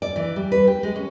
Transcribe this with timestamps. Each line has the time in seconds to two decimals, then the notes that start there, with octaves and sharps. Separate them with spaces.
0.02 D5
0.16 E3
0.36 G3
0.52 B4
0.67 G4
0.83 G#3
0.96 C#4